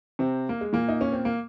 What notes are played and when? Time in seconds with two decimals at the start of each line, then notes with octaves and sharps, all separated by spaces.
0.19 C3 C4
0.49 A#3
0.61 G#3
0.73 A#2 A#3
0.89 D#4
1.01 C#4
1.12 C4
1.25 A#3